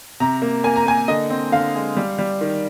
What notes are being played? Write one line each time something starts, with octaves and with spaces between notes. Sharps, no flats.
C3 A#5
A#3
A#3 G#5
A#5
A#3 G#5
D3 D#5
C4
D3 F5
G#3
G3
G3
D#3